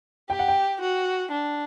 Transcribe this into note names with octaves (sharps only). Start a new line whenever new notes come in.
G4 G5
F#5
G5
F#4
D4